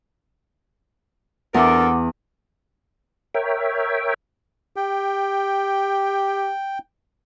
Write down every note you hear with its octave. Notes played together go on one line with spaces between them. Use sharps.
E2 D4 A4 A#4 F#5 D6
A#4 C#5 E5 G5
G4 G5